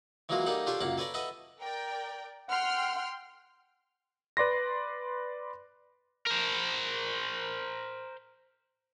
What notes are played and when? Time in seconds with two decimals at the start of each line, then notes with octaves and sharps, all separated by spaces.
0.29 E3 F#3 G#3 A#3 F4 F#4
0.46 G3 A#3 D#4 A4 A#4 F#5
0.67 D4 F4 G4 A4 C5 C#5
0.81 C#2 F#2 A#3 F5 F#5
0.98 A4 B4 C#5 D5 A#5
1.14 A4 B4 D#5 E5 F#5
1.60 A#4 D5 G5
2.49 F#5 G5 C6 F6
4.37 B4 D5 C6 A#6
6.27 A#4 C5